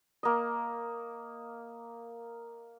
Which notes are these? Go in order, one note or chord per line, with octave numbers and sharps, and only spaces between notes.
A#3 D#5